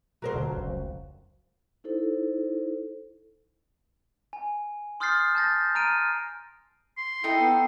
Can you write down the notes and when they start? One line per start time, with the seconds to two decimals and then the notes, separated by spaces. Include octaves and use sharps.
0.22 F#3 A#4 C5
0.34 D1 A#2 D3
0.55 F1 C#2
1.84 D#4 E4 A4 C5
4.33 G#5
5.00 C6 D#6 F6 G6 A6 C7
5.35 A5 G6 A6 A#6
5.75 G#5 A#5 F6 D7 D#7
6.98 C6
7.24 D#4 E4 A4 G5
7.40 B3